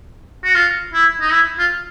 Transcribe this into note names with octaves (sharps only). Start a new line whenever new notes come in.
F#4
F4
E4
D#4
E4
F4